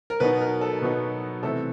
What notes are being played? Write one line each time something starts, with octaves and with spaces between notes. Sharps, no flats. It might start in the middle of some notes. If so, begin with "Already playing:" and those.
A#4
B2 F#3 B3 D#4 B4
A#4
A4
B2 F#3 B3 D#4
C3 E3 A3 A4